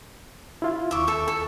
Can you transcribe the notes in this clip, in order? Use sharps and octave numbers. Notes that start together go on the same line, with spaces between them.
E4 F4 F5
D#2 E5 C#6 D6
A4 E5
A4